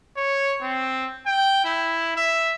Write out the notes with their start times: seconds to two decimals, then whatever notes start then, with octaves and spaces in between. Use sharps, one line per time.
0.16 C#5
0.61 C4
1.26 G5
1.64 E4
2.16 E5